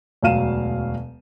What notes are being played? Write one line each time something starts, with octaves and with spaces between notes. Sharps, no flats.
E1 D2 F#3 F5 D#7 E7